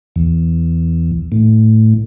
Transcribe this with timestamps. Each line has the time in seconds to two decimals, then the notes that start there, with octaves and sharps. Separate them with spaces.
0.16 E2
1.32 A2